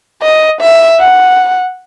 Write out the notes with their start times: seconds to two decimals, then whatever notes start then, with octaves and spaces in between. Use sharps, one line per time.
0.23 D#5
0.61 E5
1.01 F#5